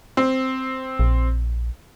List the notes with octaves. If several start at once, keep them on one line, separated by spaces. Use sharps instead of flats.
C4
A#1